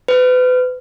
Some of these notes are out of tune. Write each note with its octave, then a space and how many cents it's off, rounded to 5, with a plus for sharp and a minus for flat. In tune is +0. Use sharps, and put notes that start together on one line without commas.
B4 +35